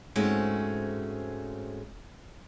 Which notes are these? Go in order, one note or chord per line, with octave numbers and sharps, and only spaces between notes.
G#2 G#3 A3 C4 C#4 F#4